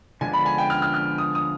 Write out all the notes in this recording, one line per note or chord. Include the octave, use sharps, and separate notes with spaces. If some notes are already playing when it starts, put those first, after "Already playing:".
D3 F3 G#3 B3 D4 G#5
B5
G#5
G5
F6
F6
F6
D#6
D#6